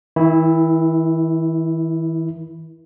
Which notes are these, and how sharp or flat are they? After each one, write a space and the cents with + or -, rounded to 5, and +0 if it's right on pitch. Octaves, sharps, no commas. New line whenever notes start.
E3 -45 E4 +0